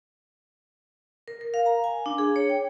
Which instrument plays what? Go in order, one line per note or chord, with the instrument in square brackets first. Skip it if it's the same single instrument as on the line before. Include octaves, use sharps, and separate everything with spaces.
[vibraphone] A#4
A#4
F5
A#5
G#5
D4
G#4
C#5
G5